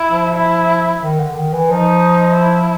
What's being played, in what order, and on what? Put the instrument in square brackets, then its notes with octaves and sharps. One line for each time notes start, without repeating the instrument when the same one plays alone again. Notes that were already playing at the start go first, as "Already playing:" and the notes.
Already playing: [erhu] E4
[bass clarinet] F3
[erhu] E4
[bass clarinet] D#3
D3
D#3
E3
[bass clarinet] F3 [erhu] D#4
[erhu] E4